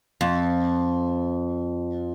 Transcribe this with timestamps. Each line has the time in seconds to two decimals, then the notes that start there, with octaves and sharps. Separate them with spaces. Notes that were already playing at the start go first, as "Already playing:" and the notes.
0.21 F2